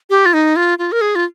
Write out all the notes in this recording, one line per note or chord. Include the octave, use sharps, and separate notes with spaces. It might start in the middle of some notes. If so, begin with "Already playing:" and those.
G4
F4
D#4
F4
F4
A#4
G#4
F4